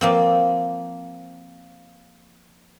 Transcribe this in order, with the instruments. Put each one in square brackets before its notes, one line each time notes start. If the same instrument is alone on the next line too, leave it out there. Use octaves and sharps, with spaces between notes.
[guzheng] F3 A#3 C4